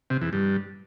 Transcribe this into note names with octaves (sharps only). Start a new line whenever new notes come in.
C3
E2
G2